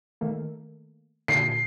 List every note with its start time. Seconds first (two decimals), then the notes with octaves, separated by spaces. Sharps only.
0.21 D#3 A3 A#3
1.28 A#2 D3 C7